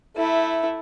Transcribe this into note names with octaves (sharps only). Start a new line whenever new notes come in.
A3 E4